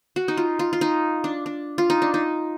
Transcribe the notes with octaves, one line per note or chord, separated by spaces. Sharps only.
F#4
D#4
F4
F4
F4
D#4
D4
D4
F4
D#4
D4
D#4